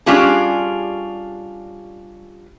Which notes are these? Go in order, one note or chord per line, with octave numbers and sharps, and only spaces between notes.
G3 C#4 D4 F4 G4 G#4